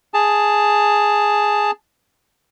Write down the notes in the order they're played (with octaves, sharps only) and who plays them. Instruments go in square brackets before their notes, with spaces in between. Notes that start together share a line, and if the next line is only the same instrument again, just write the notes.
[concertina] G#4 A5